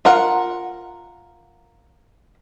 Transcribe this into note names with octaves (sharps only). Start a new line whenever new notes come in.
F4 A#4 F#5